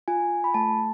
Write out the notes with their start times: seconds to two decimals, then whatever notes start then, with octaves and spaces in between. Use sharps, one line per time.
0.08 F4 G#5
0.44 B5
0.54 A3 A5